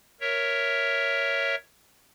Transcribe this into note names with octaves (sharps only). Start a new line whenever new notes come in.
A#4 C#5 E5